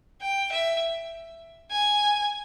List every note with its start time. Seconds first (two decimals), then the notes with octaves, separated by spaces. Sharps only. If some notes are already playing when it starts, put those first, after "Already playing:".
0.21 G5
0.52 E5
1.71 G#5